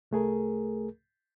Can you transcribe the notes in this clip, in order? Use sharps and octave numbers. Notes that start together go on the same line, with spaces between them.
C2 A3 G#4 A#4